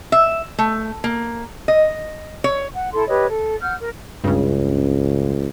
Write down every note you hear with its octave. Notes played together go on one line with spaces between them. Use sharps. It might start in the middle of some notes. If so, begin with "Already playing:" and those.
E5
A3
A#3
D#5
C#5
F#5
E4 A4 C6
G4 B4 C#5 D#5
A4
F#5 F6 G6
A#4
C#2 G2 C#3